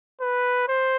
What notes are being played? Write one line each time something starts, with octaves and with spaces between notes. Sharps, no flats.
B4
C5